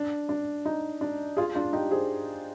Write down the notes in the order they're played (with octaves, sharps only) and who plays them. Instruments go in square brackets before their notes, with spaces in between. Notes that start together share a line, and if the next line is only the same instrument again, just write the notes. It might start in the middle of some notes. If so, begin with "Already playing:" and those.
Already playing: [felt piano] D4
D4
D#4
D4
F4 G#4
D4 F4
D#4 G4
G#4 C5